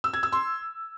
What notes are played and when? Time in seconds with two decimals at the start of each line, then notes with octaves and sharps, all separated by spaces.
0.04 E6
0.13 G#6
0.23 E6
0.32 C6